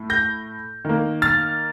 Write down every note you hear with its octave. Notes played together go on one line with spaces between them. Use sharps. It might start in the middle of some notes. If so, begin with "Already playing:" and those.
Already playing: A2 A3
G6 A#6
D#3 A#3
F6 A6